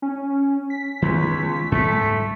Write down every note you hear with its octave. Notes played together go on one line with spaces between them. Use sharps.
C#4
B6
C#2 D#3 A3 B3
G#2 G3 A3